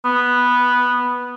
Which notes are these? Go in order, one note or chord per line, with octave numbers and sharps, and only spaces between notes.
B3